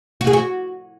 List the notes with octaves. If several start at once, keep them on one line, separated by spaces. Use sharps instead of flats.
F#4
G#4
F#4